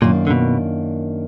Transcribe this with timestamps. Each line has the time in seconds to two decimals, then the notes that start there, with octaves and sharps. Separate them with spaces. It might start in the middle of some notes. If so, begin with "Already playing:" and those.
0.02 F#2 A#2 D#3 A#3 D4 F4
0.27 D3
0.31 B2